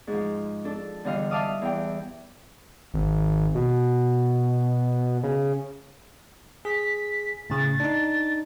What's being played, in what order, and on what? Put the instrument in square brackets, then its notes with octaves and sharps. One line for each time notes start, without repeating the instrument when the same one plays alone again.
[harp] G#2 F3
D4 A4
E2 D3 G3 D#5 F5
E5 F5 A5 D6 D#6 F6
E2 G5
[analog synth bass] G#1
B2
C#3
[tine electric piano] G#4 [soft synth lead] B6
[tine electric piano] A2 C#3 [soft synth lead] A6
[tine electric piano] D4 D#4